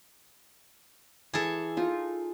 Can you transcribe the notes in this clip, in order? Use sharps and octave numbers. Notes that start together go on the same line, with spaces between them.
E3 G#4 A4
D#4 F4